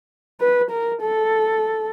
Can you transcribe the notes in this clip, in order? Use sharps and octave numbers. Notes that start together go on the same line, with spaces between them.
B4
A#4
A4